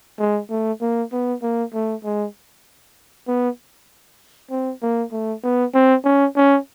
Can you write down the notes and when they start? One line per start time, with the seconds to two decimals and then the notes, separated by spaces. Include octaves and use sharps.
0.19 G#3
0.50 A3
0.82 A#3
1.12 B3
1.42 A#3
1.74 A3
2.04 G#3
3.28 B3
4.51 C4
4.82 A#3
5.12 A3
5.44 B3
5.74 C4
6.05 C#4
6.36 C#4